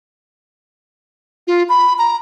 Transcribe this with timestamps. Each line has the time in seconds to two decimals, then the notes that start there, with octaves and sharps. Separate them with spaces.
1.47 F4
1.69 B5
1.98 A#5